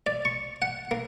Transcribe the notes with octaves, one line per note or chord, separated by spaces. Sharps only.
D5
C#6
F#5
A#3